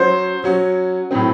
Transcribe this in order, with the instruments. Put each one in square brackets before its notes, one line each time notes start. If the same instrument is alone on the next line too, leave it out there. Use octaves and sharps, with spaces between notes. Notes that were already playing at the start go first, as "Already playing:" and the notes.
Already playing: [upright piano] F#3 C#4 F#4 [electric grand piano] C5
[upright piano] F#3 C#4 F#4
A2 F#3 C4